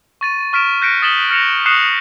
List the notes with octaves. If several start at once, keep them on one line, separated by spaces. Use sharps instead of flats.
C#6 A6 D#7
C#6 F6 B6 D7 E7
F#6 G6 A#6 B6 C#7 D7
D#6 A6 B6 E7 F#7 G7
F6 A#6 C#7 E7 F7
C#6 D#6 F#6 C7 C#7 E7